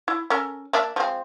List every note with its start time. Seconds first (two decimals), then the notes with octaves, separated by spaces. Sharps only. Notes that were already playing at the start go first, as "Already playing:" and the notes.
0.08 E4
0.30 C#4 A4 A#4
0.73 A#3 D4 E5
0.96 F3 G#3 C4